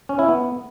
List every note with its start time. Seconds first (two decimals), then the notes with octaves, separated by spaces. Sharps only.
0.09 C#4
0.19 E4
0.28 B3